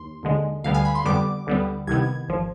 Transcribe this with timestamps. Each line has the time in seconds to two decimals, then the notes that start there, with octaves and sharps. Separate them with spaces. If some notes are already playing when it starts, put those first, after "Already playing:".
Already playing: D#2 C6
0.23 D#2 D3 G#3
0.64 D2 D3 G3 B3 F5
0.74 G#5
0.85 B5
0.95 C6
1.05 F2 D3 G3 B3 D6
1.47 D2 D3 G3 B3
1.87 C2 C3 D#3 B3 G#6
2.29 G#1 F3